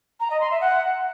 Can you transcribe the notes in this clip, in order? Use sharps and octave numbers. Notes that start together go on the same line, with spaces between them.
A#5
D#5
C6
E5
F#5